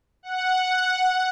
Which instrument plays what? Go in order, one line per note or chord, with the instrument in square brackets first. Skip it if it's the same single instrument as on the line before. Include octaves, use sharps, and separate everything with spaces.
[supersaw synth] F#5